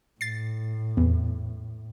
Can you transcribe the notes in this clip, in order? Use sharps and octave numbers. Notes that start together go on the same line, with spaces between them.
A2 A6 C7
E2